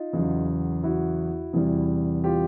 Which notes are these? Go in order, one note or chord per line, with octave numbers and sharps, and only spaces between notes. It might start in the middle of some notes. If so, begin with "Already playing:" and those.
Already playing: D#4 F4
E2 C#3 F#3
E4 F#4
E2 C3 E3 G3
F4 G4